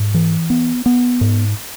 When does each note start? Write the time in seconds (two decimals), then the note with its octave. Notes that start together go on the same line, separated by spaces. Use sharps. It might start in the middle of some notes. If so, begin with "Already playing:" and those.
Already playing: G#2
0.14 E3
0.50 B3
0.86 B3
1.21 G#2